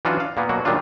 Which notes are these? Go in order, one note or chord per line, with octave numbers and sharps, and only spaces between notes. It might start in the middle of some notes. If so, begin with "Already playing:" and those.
E3 F#3 C#4 D4 F4 F#4
F5
A#2 A#3 B3
B2 F#3 A#3 F#4
A#2 D#3 F#3 G3 D4 F4